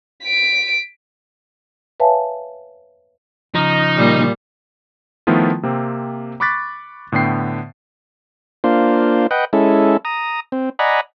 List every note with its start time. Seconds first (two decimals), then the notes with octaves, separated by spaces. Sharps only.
0.23 B6 D7
2.00 B4 C#5 E5 F5 G#5 A5
3.54 C#3 F3 D#4
3.96 A#2 G3
5.27 D#3 F3 A3 B3 E4 F4
5.63 C3 A#3 C4
6.40 B5 C#6 D6 F#6 A6 B6
7.12 A2 D3 B3 G5 C7
8.64 A#3 D4 F4 C5
9.31 B4 D#5 F#5 G5
9.53 G#3 C#4 E4 A4
10.05 A#5 D#6
10.52 C4
10.79 D5 D#5 F#5 G#5 A#5 B5